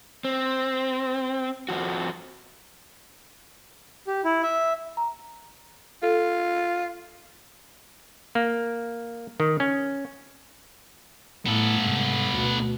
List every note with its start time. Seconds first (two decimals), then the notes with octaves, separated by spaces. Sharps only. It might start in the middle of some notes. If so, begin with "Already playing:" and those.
0.25 C4
1.69 F2 F3 F#4
4.07 G4
4.24 E4
4.43 E5
4.97 A#5
6.03 F4 A4
8.35 A#3
9.40 D#3
9.60 C#4
11.46 A2 B3 A4
11.81 G#2 C3
12.35 D2 B2